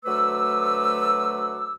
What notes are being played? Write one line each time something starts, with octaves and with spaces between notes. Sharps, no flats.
D2 F#3 A3 B4 D6 E6